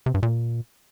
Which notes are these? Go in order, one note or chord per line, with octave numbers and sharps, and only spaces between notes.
C3
G2
A#2